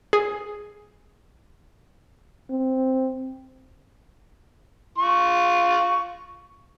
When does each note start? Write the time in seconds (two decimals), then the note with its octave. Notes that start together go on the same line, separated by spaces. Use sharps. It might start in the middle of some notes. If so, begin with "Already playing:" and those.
0.13 G#4
2.50 C4
4.98 F4 C#6